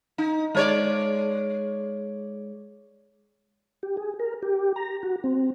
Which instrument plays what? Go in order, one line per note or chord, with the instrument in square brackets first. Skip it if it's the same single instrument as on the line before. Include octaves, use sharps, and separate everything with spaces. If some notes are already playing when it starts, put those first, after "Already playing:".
[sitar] D#4
G#3 C#5 D5
[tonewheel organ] G4
G#4
A#4
G4
A#5
F#4
C4